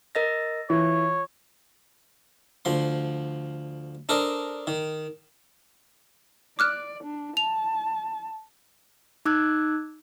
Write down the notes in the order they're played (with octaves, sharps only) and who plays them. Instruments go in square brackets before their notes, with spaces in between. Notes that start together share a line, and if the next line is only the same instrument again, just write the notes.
[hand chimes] A#4 D#5 A#6
[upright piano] E3 [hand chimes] F4 [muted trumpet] C#5
[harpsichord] D2 F3 C6
D4 A4 A#4 C5 D#5
D#3
[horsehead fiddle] D5 [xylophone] D6 F6 F#6
[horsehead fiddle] D4
[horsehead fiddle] A5 [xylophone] F7
[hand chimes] D#4 D6 E6 F#6 G#6